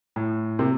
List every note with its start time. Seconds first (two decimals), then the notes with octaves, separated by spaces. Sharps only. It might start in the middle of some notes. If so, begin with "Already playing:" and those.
0.16 A2
0.59 C3 A#3 C4